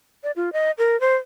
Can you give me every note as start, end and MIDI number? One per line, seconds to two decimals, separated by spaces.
0.23 0.31 74
0.36 0.52 65
0.53 0.71 75
0.78 0.99 70
1.00 1.15 72